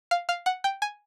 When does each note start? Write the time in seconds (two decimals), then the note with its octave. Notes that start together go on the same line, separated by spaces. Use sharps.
0.11 F5
0.29 F5
0.46 F#5
0.64 G5
0.82 G#5